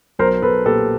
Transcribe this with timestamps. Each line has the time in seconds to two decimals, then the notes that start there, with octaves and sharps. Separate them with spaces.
0.19 B1 A#4 C5
0.42 B1 A4 B4
0.65 A#2 G4 A4